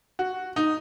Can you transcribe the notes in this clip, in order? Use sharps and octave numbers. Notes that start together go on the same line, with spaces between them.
F#4
D#4